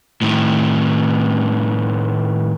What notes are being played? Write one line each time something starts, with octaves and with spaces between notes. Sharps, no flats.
A2 D#3